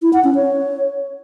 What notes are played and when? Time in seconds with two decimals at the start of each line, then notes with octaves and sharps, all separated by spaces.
0.02 E4
0.13 F#5
0.24 C#4
0.35 C#5